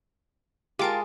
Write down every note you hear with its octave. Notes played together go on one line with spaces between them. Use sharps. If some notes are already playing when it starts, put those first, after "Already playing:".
G#3 F4 G4 A#4 A5 A6 D7